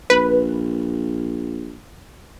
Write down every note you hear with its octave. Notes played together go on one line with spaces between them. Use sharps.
A#1 B4